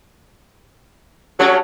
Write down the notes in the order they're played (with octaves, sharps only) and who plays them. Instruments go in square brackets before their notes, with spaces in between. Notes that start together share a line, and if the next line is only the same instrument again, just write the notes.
[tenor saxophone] F#3 [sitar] G3 A3 C#4